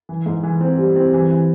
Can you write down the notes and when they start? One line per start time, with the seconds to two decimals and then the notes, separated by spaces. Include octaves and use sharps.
0.09 E3
0.26 G#2
0.43 E3
0.61 C4
0.78 G3
0.96 C4
1.13 E3
1.31 E3